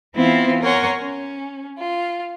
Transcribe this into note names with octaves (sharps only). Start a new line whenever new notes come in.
E3 B3 C4 E4 F4
A#4 C#5 F#5 G#5 A#5 C6
C#4
F4